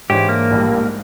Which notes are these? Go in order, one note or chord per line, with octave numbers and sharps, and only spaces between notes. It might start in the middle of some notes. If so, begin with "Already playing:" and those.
G#2 E3 D4 G4 C5 C#5
A#3
A#1 A2 G3
G#2